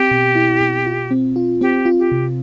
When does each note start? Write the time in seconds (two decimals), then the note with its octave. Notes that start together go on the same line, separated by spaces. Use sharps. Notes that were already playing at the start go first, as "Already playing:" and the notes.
Already playing: C4 G4
0.11 B2
0.35 E4
0.61 B2
0.86 F4
1.11 C4
1.36 F4
1.61 C4 G4
1.85 F4
1.98 G4
2.12 C3